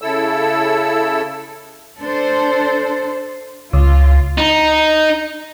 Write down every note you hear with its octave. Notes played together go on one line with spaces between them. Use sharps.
C#3 E4 A4 E6
D4 A4 C5
C#2 F4
D#4